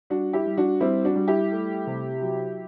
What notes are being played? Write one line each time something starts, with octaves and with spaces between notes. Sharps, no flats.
G3 D4 F#4
E4 G4
G3
D4 F#4
G3 C4 E4
D4 F#4
G3
E4 G4
A3
C3
F#3